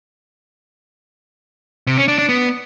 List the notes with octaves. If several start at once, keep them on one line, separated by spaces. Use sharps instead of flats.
C3
C#4
D4
D4
B3